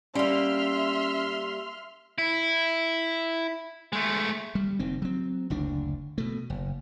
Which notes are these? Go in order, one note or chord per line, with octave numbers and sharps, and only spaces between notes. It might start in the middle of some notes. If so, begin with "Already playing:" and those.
G3 A#3 C#4 E5 C6 F6
E4
G#3 A3
G3
F#1 D#3 C4
F#3 C4
F#1 D2 D4
B2 A3
F#1